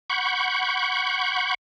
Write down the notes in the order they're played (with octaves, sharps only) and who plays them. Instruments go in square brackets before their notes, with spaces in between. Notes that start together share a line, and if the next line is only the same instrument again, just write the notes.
[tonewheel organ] F#5 B5 C#6 G6